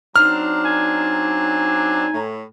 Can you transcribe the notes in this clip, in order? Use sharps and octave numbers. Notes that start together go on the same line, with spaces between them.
F#3 C4 D4 D#4 F6
G#5
A2